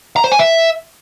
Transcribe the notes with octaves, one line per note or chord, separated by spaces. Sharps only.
A#5
C5
G#5
E5